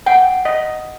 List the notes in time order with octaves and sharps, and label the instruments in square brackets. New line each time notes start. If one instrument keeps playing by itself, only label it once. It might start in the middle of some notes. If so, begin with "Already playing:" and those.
[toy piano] F#5 [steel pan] G5
[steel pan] D#5